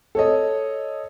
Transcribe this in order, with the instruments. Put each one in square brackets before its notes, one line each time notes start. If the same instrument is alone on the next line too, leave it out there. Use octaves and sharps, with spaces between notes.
[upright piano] A4 C#5 D#5